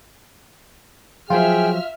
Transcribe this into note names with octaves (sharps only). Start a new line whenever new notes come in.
F3 F#3 F4 G#4 C5 E5 G5 F6